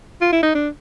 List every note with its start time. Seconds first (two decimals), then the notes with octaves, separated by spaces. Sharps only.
0.21 F4
0.32 E4
0.43 D#4
0.55 D4